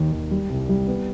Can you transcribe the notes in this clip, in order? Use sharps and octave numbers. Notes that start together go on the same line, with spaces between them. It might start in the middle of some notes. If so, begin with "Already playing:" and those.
Already playing: D#2 D#3
D#2
G3
C2
G3
B3